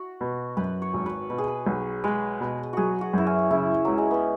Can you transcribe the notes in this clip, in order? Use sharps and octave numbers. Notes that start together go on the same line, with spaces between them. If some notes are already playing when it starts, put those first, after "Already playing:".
Already playing: F#4
B2
F#2 B4
C#5
G#1
B4
B2 B4
G#4
B4
B1
G#3 B4
B2
F#3 F#4 G#4
F#4
F#2 E4
C#4
C#3 E4
C#2 F#3
G#3
B3